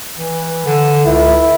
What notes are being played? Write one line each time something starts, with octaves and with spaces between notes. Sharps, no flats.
E3
D3
C#2 E4